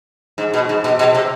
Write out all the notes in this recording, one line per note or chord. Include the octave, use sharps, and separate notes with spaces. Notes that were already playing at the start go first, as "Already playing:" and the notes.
G#2
B2
G#2
B2
B2
C3